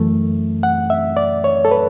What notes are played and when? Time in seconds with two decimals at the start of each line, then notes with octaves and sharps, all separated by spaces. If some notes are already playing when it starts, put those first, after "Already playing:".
Already playing: F#2 E3 A3
0.63 F#5
0.90 E5
1.17 D5
1.44 C#5
1.65 A4
1.71 B4